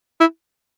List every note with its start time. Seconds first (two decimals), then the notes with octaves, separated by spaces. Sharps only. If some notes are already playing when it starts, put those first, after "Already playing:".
0.20 E4